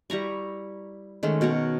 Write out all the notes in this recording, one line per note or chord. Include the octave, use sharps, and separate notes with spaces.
G3 E4 A#5 C#6
D#3 G#3 A3 C#4
B2 A#4 C#5 F#5